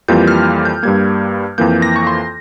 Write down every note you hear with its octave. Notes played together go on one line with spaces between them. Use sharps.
F2 E3 G3 A#3 F4 G6
F6
G6
G2 G3 A#3 G#6
F2 E3 A#3 G6
A#6
C#6
C6